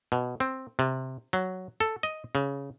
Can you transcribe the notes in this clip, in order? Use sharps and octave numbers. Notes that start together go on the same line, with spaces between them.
B2
C4
C3
F#3
A4
D#5
C#3